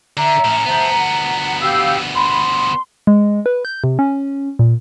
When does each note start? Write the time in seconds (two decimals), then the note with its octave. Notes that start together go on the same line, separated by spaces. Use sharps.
0.17 D3 E5 A#5
0.44 A2 C#4
0.66 D2 B3 C5 E5 A5
0.98 F#5
1.61 G4 F5 E6
2.15 B5 C6
3.07 G#3
3.46 B4
3.65 G6
3.84 C3
3.99 C#4
4.59 A#2